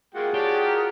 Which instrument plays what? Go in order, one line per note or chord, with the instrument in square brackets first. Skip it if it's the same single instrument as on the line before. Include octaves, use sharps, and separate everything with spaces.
[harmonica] G#3 A#3 G5 [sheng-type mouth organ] F4 F#4 F#5 [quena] G#4
[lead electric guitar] G4 [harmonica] C#5 D5 A5
[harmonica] A#5 F6